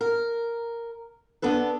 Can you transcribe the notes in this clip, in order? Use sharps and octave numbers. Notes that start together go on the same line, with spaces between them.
A#4
B3 D4 A4 B4